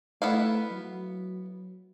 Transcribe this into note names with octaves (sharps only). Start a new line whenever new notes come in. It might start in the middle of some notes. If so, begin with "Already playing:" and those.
A3 B3 E4 F5
F#3